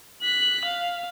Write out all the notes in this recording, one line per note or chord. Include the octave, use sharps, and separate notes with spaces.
F#6 B6
F5